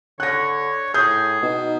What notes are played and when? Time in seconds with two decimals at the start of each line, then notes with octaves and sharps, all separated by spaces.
0.20 D3 C#5 F#6 A#6
0.94 A2 G#4 D#6 G6
1.42 B2 D#4